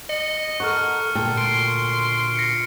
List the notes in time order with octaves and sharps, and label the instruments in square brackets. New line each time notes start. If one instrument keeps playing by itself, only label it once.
[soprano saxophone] D#5 [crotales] C#7
[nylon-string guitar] A4 A#4 F#5 [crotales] C#6 F6
[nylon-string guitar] D2 A#2 A4 [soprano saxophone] G5
[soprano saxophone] C6 [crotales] D7
[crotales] A#6 C7 C#7